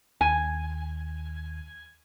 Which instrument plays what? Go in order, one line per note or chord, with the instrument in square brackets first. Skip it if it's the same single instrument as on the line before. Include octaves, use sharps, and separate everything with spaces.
[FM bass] D#2 [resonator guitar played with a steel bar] G#5